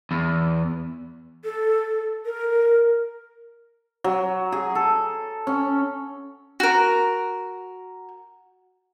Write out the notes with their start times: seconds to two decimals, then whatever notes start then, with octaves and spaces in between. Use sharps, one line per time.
0.11 E2
1.44 A4
2.25 A#4
4.04 F#3
4.52 G#4
4.75 A4
5.47 C#4
6.60 F#4 A#4